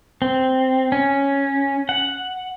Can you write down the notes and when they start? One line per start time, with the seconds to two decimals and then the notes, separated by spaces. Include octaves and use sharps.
0.22 C4
0.92 C#4
1.89 F#5